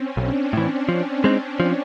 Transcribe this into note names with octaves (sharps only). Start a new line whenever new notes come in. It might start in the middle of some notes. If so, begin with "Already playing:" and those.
Already playing: C4 C#4
B1 D4
A2 E3
F3
G#3 C4 D#4
F3